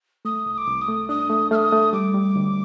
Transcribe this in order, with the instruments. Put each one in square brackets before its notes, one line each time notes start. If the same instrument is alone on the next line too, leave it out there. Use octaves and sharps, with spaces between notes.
[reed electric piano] A3 [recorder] D#6
[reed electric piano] C2
[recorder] D#6
D6
[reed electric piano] C2
[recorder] D#6
[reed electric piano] A3
[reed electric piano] D4 [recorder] D#6
[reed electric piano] A3
[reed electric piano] A3 [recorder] F6
[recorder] D#6
[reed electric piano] A3
[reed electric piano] G3 [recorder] D6
[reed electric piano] G3
D2